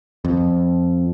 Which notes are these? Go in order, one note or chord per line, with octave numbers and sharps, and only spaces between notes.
F2